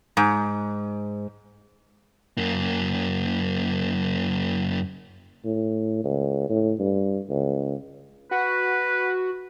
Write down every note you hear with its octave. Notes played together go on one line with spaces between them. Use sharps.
G#2
F#2 A#3
A2
C#2
A2
G2
C#2
F#4 B4